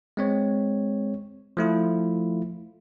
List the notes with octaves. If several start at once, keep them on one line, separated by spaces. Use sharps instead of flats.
G#3 C4 C#5
F3 A3 E4 F4